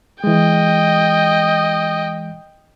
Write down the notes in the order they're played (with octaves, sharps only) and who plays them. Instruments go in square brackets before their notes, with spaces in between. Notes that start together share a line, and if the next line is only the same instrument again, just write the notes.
[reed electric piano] E3 G#3 [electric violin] D#5 G5